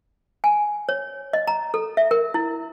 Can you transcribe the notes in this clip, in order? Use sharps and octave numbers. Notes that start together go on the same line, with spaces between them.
G#5
C#5
D#5
A#5
A4
E5
A#4
E4